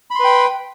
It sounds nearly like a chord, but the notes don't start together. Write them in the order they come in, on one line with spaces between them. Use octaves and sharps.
B5 C6 B4 G5